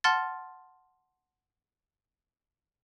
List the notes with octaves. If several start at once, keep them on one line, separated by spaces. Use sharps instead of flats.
F#5 A5 C6 F6 A6